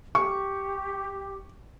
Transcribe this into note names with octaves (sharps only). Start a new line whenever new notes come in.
G4 C#6